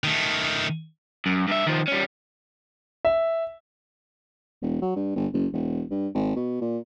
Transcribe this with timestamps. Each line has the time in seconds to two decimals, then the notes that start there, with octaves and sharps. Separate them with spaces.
0.04 D#3 A3
1.26 F#2
1.48 G2 E5
1.66 D#3 F3
1.88 G3 C#4
3.05 E5
4.62 E1
4.82 F#3
4.96 G2
5.16 G1
5.34 F#1
5.53 E1
5.91 G2
6.15 G#1
6.36 B2
6.61 A#2